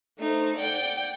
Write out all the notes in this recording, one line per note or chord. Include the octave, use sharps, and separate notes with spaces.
A3 D#4 C5
D5 F#5 G5